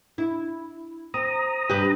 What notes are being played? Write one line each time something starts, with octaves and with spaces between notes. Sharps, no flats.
E4
C4 A#5 D#6
G2 G4 B4